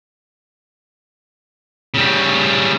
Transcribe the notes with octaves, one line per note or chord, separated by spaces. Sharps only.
C#3 G3